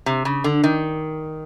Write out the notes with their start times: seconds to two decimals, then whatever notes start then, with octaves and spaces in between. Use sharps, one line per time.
0.06 C3
0.25 C#3
0.44 D3
0.64 D#3